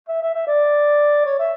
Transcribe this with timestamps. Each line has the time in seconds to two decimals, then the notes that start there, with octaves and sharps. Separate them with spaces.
0.09 E5
0.22 E5
0.34 E5
0.47 D5
1.25 C#5
1.39 E5